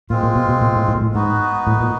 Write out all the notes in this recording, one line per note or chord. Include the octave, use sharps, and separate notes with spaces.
A#2 G#3 C4 F4
A#2
B2
B2
A#2
A2
A2
A#2
A2
G#2 B3 D#4 F#4 B4
A2
A#2